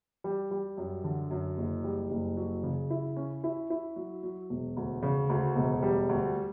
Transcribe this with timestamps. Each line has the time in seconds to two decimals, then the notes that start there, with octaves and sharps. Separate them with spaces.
0.24 G3
0.51 G3
0.78 F#2
1.04 D3
1.31 F#2
1.57 F#1
1.84 G3
2.11 F#1
2.37 F#3
2.63 C#3
2.90 E4
3.17 C#4
3.44 E4
3.70 E4
3.96 F#3
4.23 F#3
4.50 E1
4.77 D2
5.03 C#3
5.29 D2
5.56 E1
5.82 G3
6.09 D2